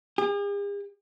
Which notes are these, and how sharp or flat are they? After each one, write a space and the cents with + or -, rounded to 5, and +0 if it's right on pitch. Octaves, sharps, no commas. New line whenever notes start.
G#4 -45